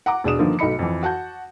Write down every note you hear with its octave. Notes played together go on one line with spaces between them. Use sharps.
F#5 A#5 D6
E1 G#3 D4 D#6 E7
G2 D3 D#3 F3 A#3
B1 A3 D#4 B5 C#7
F2 E3
F#4 F#5 A5 G6